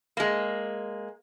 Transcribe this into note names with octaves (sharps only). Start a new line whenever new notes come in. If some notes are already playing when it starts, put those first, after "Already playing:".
G#3 A#3